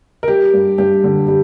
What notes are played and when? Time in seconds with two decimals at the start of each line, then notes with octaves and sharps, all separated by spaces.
0.23 A#4
0.28 G3 G4
0.53 G2
0.78 G2 G4
1.04 D3
1.28 G3 G4